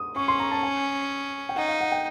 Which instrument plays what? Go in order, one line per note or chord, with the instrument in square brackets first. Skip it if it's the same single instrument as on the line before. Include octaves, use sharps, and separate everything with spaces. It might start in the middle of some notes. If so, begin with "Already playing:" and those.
Already playing: [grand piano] D#6
[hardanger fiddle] C#4 [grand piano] C#6
[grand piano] C6
A#5
A5
G#5
G5
[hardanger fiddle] D#4 [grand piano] F#5
[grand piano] F5
F#5
G5